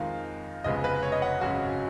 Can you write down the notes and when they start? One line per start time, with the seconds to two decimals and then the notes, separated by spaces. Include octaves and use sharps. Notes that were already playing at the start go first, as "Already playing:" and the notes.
Already playing: F2 D#3 G#3 F5
0.64 F1 F2 C#3 G#3 B3 D#5
0.84 B4
1.03 C#5
1.12 D#5
1.22 F#5
1.41 G#1 F#2 C#3 G#3 C#4 F#4